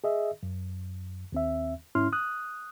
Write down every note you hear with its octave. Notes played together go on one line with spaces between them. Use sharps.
G#4 D#5 E5
F#2
D#2 C4 E5
G#2 C#4 E4 C6 F6
D#6 F#6